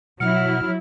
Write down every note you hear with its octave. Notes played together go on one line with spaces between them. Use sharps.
B2 F#3 E4 F#5 F6